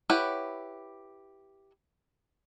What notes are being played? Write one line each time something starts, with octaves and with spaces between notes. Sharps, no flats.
E4 G4 B4 C#5 F#5